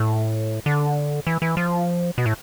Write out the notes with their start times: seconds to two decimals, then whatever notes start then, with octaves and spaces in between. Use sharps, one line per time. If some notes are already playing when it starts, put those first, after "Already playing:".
Already playing: A2
0.66 D3
1.27 E3
1.42 E3
1.57 F3
2.18 B2
2.26 A2